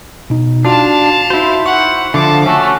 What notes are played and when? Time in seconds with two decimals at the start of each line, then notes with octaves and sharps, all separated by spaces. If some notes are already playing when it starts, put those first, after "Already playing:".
0.30 B2 D#4
0.65 D4 F4 F#4 F5 A5 C6
1.30 D#4 E4 F#4 C5
1.66 F#5 C#6
2.14 D3 F3 E5 A5 D6
2.46 A3 C#4 F#4